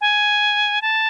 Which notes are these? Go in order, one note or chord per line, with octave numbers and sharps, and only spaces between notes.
G#5
A5